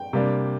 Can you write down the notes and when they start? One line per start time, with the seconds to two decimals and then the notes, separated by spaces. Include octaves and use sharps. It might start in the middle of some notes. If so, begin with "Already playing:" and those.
Already playing: G5
0.13 C3 G3 A#3 D4